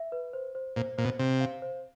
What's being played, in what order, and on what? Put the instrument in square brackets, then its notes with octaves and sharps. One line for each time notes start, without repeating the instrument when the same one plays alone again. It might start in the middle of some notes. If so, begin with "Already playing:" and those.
Already playing: [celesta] E5
B4
C5
C5
[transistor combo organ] A#2 [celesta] C5
[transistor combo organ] A#2 [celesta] C5
[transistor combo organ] B2
[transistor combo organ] C3 [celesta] C5
[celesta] F5
C5